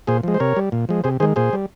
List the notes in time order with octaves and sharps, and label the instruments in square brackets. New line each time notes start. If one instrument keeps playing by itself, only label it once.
[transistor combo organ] A#2 G#4 C5
F3 G#3
C5
C3 A#4 C#5
G3
A#2
F3 G#3
C3 G#4 C5
D#3 G#3 G#4 C5
A#2 G#4 C5
G3